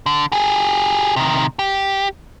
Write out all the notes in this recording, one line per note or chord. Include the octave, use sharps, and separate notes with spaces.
D3
G4 G#4
C3 D#3
G4